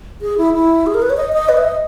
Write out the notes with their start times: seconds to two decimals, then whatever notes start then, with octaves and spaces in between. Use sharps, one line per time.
0.22 G#4
0.38 E4
0.54 E4
0.87 G#4
0.94 A#4
1.02 B4
1.10 C#5
1.17 D#5
1.33 D#5
1.49 B4
1.57 E5
1.64 D#5